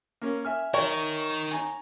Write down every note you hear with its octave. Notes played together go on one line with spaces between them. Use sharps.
A#3 C#4
E5 G#5 F6
D#4 A#4 C#5
G#5 A#5